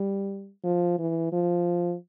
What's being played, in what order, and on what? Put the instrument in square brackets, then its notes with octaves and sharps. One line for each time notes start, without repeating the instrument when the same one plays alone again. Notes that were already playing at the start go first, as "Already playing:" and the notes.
Already playing: [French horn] G3
F3
E3
F3